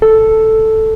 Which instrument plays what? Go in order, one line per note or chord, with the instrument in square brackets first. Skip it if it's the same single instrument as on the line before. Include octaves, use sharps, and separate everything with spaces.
[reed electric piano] A4